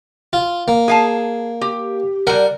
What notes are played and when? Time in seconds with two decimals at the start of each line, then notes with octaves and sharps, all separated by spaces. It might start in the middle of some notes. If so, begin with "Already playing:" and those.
0.33 F4
0.68 A#3
0.88 G#4 F5 A5
1.61 G4
2.27 G3 A#4 F#5